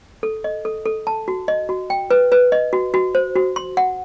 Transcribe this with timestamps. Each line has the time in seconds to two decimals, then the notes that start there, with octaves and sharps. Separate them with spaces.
0.23 A4
0.44 D#5
0.65 A4
0.85 A4
1.07 A5
1.28 F#4
1.48 D#5
1.69 F#4
1.90 G5
2.10 B4
2.32 B4
2.52 D#5
2.73 F#4
2.94 F#4
3.15 C5
3.36 F#4
3.56 C6
3.77 F#5